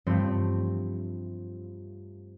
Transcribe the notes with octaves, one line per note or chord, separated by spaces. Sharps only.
G2 F3 G3 A3 C4